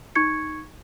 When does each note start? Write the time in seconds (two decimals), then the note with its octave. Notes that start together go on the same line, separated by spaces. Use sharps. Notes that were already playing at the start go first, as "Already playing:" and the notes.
0.15 D#4 C#6 G#6 C#7